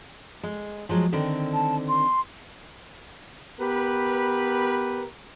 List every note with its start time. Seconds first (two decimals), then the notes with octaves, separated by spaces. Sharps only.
0.43 G#3
0.89 F3 F#3 G#3
1.12 D3 D#3 C4
1.54 A5
1.88 C6
3.60 B3 G4 A#4 B4